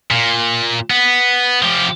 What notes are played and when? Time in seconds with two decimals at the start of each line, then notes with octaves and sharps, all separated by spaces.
0.11 A#2
0.90 B3
1.62 F3 G4